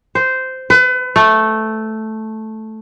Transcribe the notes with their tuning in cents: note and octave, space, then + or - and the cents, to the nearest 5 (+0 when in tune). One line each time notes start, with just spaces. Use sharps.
C5 -10
B4 +35
A3 -5